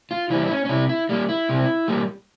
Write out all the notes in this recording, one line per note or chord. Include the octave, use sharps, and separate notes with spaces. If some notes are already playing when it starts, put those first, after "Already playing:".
F4
E3 G3 A#3 E4
E4
C#4
C#4
C3 E4
E4
G3 A#3
E4
C3
G3 A#3